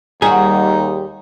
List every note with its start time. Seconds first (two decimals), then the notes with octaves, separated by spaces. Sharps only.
0.22 D#2 G3 D#4 F#4 G#4